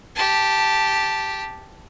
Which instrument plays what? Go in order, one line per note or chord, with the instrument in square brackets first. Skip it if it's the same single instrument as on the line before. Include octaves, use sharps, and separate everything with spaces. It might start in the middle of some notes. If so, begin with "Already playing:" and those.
[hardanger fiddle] G4 A5